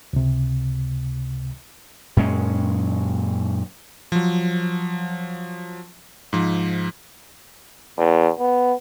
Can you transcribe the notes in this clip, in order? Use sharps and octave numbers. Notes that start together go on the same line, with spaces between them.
C#2 C3
F#2 A#2 G#3 C#4
F3 F#3
G#2 F3
E2
B3